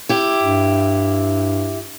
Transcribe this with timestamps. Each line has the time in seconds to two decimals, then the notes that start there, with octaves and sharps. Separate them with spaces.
0.09 E4 G4
0.43 G2